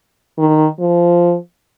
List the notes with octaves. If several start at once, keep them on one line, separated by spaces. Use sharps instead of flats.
D#3
F3